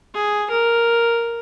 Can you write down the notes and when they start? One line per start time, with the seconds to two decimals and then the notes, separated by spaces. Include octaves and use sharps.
0.14 G#4
0.50 A#4